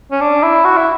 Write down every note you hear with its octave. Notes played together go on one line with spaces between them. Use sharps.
C#4
D4
E4
F#4
E4